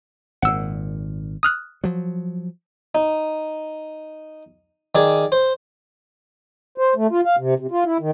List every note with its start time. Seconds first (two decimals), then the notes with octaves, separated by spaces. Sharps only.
0.42 G#1 A#2 F#5 E6
1.43 D#6 F6 F#6
1.84 F3 F#3
2.95 D#4
4.95 D#3 G#4 D5
5.32 C5
6.78 C5
6.96 A3
7.11 F4
7.25 F5
7.37 C3
7.59 C3
7.71 F4
7.84 E4
8.00 D#3